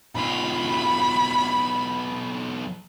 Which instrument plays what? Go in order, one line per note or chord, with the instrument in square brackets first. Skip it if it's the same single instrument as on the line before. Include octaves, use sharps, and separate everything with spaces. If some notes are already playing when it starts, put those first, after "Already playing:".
[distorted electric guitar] B1 F4 [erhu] B5